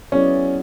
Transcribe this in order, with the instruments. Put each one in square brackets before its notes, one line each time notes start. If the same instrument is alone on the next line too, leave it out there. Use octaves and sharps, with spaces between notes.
[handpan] F#3 B3 E4 G#4 D5 [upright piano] C#4